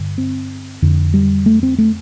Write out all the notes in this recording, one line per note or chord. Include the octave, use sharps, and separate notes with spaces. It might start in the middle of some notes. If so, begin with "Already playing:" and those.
Already playing: G2 D3
C4
F2 D3
G3
A3
C4
A3